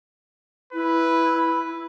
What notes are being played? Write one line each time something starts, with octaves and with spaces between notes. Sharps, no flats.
E4 B4